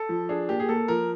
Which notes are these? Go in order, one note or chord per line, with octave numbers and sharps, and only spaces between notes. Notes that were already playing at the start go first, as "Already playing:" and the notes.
Already playing: A4
F3
D4 G#4
A#2 G4
G#4
A#3 A4
F3 A#4